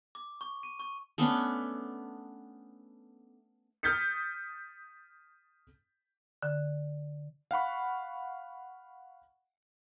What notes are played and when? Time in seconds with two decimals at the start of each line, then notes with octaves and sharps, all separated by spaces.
0.15 D6
0.41 C#6
0.63 D#7
0.80 C#6
1.18 A3 B3 C#4 D4
3.83 D#6 F6 G6 A6 B6 C#7
6.43 D3
7.51 F5 F#5 B5 C#6